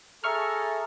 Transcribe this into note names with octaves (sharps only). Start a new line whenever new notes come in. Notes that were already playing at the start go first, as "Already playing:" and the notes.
G#4 A4 E5 A#5 C#6 F6